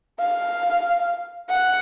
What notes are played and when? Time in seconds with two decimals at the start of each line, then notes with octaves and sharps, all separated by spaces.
0.20 F5
1.50 F#5